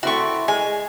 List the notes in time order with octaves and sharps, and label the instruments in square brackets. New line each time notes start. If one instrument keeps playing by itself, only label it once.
[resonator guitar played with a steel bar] A3 C4 E4 [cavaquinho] F#4 C#6
[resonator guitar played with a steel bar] G#3 [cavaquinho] G#5